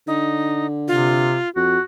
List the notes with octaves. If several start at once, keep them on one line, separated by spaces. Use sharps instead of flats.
D3 D#4
C3 F4
F2 F#4